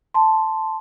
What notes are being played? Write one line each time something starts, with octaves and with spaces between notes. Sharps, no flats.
A5 C6